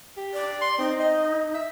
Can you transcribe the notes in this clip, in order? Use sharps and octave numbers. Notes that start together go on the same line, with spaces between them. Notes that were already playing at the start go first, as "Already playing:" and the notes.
G4
D5
C6
C4 D#4
D#5
E5